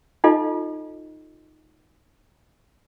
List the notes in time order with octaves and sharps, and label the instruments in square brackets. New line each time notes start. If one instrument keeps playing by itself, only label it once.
[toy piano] D#4 F4 A4 D#5